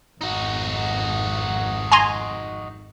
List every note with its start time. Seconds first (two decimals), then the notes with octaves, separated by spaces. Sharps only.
0.21 G#1 F2 D#4 F#4
1.92 G#5 A#5 C6